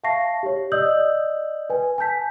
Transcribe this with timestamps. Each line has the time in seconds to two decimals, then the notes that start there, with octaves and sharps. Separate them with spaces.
0.04 E5 F5 A5 C#6 A#6 C7
0.43 G4 C#5
0.72 D5 D#5 D#6 E6 G6 F#7
1.70 B4 G#5
1.98 G#5 A5 G6 B6